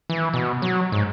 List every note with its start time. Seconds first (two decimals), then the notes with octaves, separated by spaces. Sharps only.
0.10 E3
0.34 B2
0.62 F#3
0.92 G#2